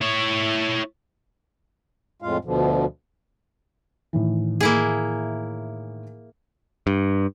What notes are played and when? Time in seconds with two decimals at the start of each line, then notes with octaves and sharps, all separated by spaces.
0.01 E4 C#5
2.22 F2 A2 G#3 F4 F5
2.45 D2 B2 D3 F3
4.13 A2 D#3 E3
4.61 A#3 E4 G#4
6.87 G2